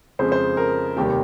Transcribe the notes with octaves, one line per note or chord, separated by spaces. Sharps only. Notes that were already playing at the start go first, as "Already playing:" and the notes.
F2 C#3 G#3 C5
C5
A#4
F1 D#2 D#3 G3 G4